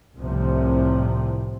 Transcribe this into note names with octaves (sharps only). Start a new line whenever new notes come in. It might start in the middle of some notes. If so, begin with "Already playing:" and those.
C2 A2 C3 F3